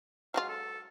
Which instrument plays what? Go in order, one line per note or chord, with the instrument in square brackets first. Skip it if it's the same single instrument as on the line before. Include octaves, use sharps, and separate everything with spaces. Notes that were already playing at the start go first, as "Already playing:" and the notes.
[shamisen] F#3 G#3 F4 [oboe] F5
[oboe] A4